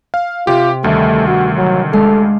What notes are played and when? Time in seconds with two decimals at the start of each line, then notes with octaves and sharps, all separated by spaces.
0.14 F5
0.47 C3 F4 G4
0.84 D2 D#3 G3 A3
1.28 F#4
1.57 F#3
1.93 G#3 D4 A4 F5